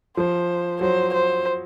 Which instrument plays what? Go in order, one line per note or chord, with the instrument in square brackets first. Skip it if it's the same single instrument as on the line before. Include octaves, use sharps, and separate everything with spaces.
[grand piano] F3 [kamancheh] C5
[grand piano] F#3 [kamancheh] C5
[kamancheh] C5